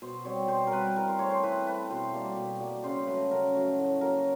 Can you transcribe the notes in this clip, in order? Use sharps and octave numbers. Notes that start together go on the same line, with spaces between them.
B2 C5
G3 C4 C#5
B2 C5
A#4
G3 C4 B4
E3 A#4
C5
A3 C4 C#5
C5
E3 B4
A3 C4 B4
B2 C5
G3 A#3
B2
G3 A#3
C#3 C5
F#3 A3 B4
C#3 A#4
F#3 A3
A2
F#3 A#3 A#4